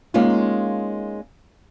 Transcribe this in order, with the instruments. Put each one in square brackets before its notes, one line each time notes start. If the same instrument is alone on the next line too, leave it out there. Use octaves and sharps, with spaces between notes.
[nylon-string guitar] G#3 A#3 C#4 D#4 F4